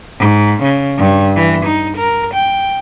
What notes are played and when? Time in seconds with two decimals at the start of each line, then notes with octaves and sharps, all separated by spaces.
0.19 G#2
0.62 C#3
0.98 G2
1.36 E3
1.65 D#4
1.97 A#4
2.34 G5